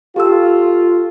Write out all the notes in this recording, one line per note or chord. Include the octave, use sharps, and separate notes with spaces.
F4 G4 A4 E6